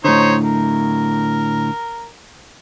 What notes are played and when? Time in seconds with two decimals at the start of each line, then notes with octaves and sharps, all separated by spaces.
0.05 A2 D3 D#4 C5 C#5
0.44 A#4